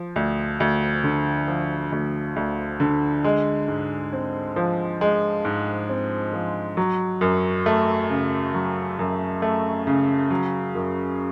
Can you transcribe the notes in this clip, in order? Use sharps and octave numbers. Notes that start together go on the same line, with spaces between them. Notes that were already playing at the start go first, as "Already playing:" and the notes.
Already playing: F3
D2
D2
D3
F3
D2
D2
D3
G#3
G#2
C4
F3
G#3
G#2
C4
F3
F#3
F#2
A3
C#3
F#3
F#2
A3
C#3
F#3
F#2